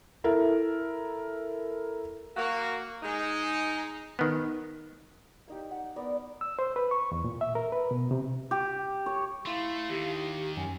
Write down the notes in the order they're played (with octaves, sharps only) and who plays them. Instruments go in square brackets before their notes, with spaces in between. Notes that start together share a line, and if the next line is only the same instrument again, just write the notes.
[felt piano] E4 A4 A#4
[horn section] A#3 F#4
G#3 D#4
[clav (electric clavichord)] D#3 B3
[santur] A#3 D#4 G4
F#5
B3 A#4 D5
[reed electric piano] E6
C5
B4
C#6
E2
A#2
E5
A#4
B4
B2
C3
[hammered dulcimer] G4
C#5
[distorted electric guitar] A3 [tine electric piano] E4 C6 [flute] F5
[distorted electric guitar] D#2 D#3 [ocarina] G4
[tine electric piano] F#2 [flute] G#5